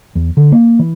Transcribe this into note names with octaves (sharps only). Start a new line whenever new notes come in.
E2
D3
A#3
E3